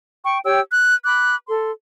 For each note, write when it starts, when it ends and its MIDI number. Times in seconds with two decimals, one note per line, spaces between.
0.23 0.38 79
0.23 0.38 85
0.44 0.60 67
0.44 0.60 73
0.44 0.60 79
0.44 0.60 88
0.71 0.94 90
1.05 1.35 83
1.05 1.35 86
1.05 1.35 90
1.48 1.71 69
1.48 1.71 84